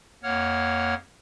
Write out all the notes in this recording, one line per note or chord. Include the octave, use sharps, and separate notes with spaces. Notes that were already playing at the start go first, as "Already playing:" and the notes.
F2 A#3 C#5 F#5 F6